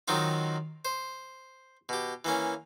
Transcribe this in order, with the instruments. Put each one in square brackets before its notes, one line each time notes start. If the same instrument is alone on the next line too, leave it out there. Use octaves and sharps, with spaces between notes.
[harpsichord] D#3 F#3 C4 D#4 F4
C5
B2 G4
E3 A#3 C#4